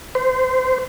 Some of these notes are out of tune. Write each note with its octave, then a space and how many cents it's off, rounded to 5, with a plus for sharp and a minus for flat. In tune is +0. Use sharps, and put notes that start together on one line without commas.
C5 -25